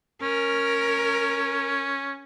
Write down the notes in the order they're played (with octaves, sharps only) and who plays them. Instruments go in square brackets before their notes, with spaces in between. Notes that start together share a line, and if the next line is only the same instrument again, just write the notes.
[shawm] C#4 [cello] A#4